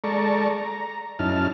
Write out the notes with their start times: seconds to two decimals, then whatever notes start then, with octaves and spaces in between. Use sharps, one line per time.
0.04 G#3 A4 D5 A5 A#5 C#6
0.58 A#5
1.19 F#2 C#4 D#4 E4 A5 F6